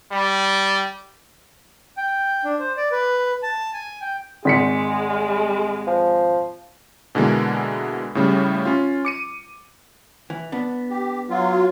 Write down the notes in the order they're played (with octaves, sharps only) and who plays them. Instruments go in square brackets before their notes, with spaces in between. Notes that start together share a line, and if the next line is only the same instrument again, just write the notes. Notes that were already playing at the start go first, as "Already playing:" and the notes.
[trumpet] G3
[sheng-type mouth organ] G5
D4
C5
D5
B4
A5
G#5
G5
[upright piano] G#1 B6 C#7 [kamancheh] G#3
[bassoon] F3
[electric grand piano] B2 D3 E3 G#3 A#3
A2 C#3 G3
C#4 F4
D6 C#7 D#7
[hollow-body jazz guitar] E3
B3 D4
[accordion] G4
[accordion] F#3 F4 [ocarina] F#5
[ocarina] F#4